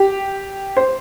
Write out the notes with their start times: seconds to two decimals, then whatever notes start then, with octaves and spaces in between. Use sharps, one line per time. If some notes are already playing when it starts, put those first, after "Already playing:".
Already playing: G4
0.77 C5